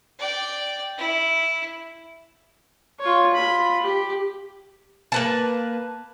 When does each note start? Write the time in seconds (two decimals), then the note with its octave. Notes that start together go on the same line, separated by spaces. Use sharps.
0.19 D5 G5
0.98 E4
3.00 F4 C#5
3.34 F4 B5
3.82 G4
5.12 A#3 B4 A5